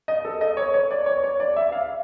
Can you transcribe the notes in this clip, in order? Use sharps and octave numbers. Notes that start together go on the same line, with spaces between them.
D#5
A4
D#5
C#5
C#5
D5
C#5
C#5
D5
E5
F5